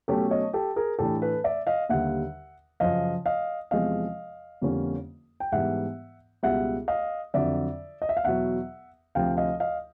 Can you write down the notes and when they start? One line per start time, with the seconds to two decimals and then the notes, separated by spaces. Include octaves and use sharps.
0.08 B2 F#3 A3 C#4 G4 A4
0.31 C#5 D#5
0.53 G4 A4
0.76 G#4 A#4
0.99 A2 E3 A3 D4 G4 A4
1.22 A4 B4
1.44 D5 E5
1.67 D#5 F5
1.89 D#2 D3 G3 E5 F#5
2.80 F#2 C#3 F3 D#5 F5
3.26 D#5 F5
3.71 E2 C3 F3 G#3 D#5 F5
4.62 F2 D3 G3 A#3 C#4
5.40 G5
5.52 G#2 E3 G3 B3 E5 F#5
6.43 C#2 B2 G3 E5 F#5
6.88 D#5 F5
7.34 F2 D3 F#3 D5 E5
8.02 D#5
8.09 E5
8.17 F5
8.24 E2 B2 F#3 E5 F#5
9.15 D2 C3 F3 F5 G5
9.37 D#5 F5
9.60 D#5 F5